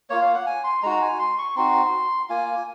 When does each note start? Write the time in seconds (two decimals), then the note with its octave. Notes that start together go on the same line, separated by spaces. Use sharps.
0.10 A#3 F4 C#5
0.22 F5
0.35 F#5
0.46 G#5
0.64 C6
0.83 G#3 D#4 F#4 A#5
1.02 G#5
1.19 C6
1.39 C#6
1.56 C4 D#4 F#4 C6
2.29 A#3 F4 G#5